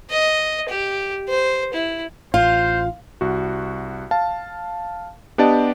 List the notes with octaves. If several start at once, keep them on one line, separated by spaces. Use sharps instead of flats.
D#5
G4
C5
E4
A1 F4 C5 F5
C2 F#4
F5 A5
B3 D4 G4 D5 D#5 A5